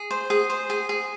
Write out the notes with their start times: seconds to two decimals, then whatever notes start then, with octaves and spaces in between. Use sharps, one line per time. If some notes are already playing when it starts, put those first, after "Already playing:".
Already playing: G#4
0.11 C5
0.30 G#4
0.50 C5
0.70 G#4
0.89 G#4